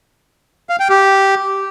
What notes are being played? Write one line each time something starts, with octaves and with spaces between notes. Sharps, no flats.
F5
G5
G4